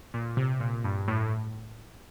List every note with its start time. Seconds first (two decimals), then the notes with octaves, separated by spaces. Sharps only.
0.14 A#2
0.37 C3
0.60 A#2
0.84 G2
1.08 A2